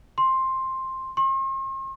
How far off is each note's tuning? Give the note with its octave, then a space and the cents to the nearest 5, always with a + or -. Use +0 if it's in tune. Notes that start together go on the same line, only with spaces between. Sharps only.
C6 +10
C6 +45